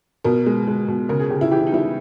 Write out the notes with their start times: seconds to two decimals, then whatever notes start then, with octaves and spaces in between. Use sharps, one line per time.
0.24 B2 A#4
0.46 G#3
0.68 G#3
0.88 B2
1.09 C#3 A#4
1.20 G#4
1.30 C#3 G4
1.41 E4
1.52 E3 G4
1.59 E4
1.67 D#4
1.72 G3 E4